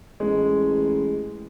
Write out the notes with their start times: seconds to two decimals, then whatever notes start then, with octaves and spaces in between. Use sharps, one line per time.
0.20 A1 G#3